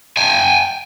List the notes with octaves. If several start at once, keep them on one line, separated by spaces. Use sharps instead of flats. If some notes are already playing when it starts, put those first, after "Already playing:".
G5 G#5